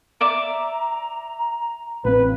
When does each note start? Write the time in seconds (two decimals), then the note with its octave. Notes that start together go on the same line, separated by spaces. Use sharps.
0.21 D5 E5 A#5 D6
2.05 A1 C4 B4 F5